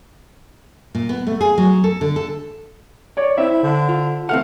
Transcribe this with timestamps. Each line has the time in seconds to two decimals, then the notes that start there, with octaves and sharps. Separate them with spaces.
0.95 A#2
1.09 B3
1.27 A3
1.41 G#4
1.58 F#3
1.84 A4
2.01 D3
2.16 A4
3.17 C#5 D5
3.38 C4 E4 E5
3.63 D3
3.89 F4
4.29 E3 A3 C4 F5 F#5 F6